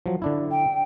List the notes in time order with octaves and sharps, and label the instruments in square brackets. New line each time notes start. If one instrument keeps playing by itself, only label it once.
[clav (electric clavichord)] F3 F#3
D3 D4 E4
[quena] G5